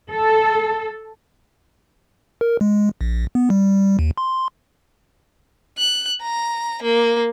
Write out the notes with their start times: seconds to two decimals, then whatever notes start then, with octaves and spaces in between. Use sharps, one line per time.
0.11 A4
2.41 A#4
2.61 G#3
3.01 A#1
3.35 B3
3.50 G3
3.99 D#2
4.18 C6
5.78 F#6
6.22 A#5
6.83 A#3